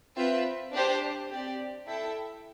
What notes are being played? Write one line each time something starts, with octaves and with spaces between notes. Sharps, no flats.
C4 F4 B4 E5 G5
D4 G4 C5
C4 G4 D5
E4 A4 E5 G5